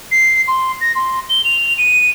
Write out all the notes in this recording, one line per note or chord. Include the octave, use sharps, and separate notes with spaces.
C7
C6
A#6
C6
G7
F7
D#7